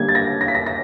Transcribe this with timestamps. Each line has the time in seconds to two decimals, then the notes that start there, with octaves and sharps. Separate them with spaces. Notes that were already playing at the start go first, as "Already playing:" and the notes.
Already playing: D3 G3 A#3 G#6
0.09 A6
0.15 A#6
0.41 A#6
0.48 B6
0.55 A#6
0.66 A#6